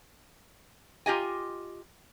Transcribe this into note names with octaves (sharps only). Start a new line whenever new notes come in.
F4 G4 D#5 G#5